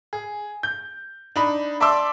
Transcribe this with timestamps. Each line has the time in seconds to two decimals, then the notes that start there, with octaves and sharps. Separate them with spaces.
0.13 G#4
0.63 G6
1.36 D4 D#4 B5
1.80 D5 E5 A5 C6 D6 E6